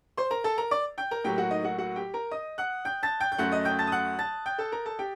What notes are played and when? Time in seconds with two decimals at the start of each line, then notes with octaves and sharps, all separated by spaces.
0.17 C5 C6
0.31 A#4 A#5
0.44 A4 A5
0.58 A#4 A#5
0.71 D5 D6
0.98 G5 G6
1.11 A#4 A#5
1.24 A2 F#3 A#3 G4 G5
1.38 F#4 F#5
1.51 D#4 D#5
1.64 F#4 F#5
1.78 F#4 F#5
1.96 G4 G5
2.14 A#4 A#5
2.31 D#5 D#6
2.58 F#5 F#6
2.85 G5 G6
3.03 A5 A6
3.20 G5 G6
3.32 G6
3.38 F#2 F#3 A3 F#5 F#6
3.52 D#5 D#6
3.65 G5 G6
3.79 A5 A6
3.87 D#6
3.92 F#5 F#6
4.19 A5 A6
4.46 G5 G6
4.58 A4 A5
4.72 A#4 A#5
4.85 A4 A5
4.99 G4 G5